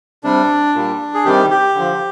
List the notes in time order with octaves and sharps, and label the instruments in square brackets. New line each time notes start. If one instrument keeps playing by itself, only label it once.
[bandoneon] C3 G3 D4
A#2 G3
G#4
C3 D#3 G3 G4
G4
D3 F3